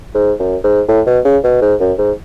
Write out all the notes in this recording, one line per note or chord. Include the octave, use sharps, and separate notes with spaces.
G#2
F#2
G#2
A2
B2
C#3
B2
G#2
F#2
G#2